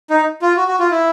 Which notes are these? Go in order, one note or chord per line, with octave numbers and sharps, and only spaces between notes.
D#4
F4
F#4
F#4
F4
E4